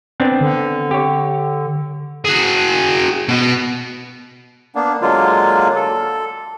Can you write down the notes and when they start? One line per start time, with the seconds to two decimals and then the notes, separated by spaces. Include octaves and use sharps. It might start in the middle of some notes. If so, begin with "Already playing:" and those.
0.20 B3 C4 D4
0.41 D3
0.91 G4 C#5
2.25 F#4 G#4
3.29 B2 B3
4.75 A#3 B3 D4
5.02 D3 F#3 G#3 A#3 F4
5.76 A4